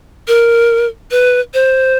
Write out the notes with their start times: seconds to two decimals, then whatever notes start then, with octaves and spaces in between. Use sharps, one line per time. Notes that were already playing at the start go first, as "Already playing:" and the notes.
0.28 A#4
1.11 B4
1.54 C5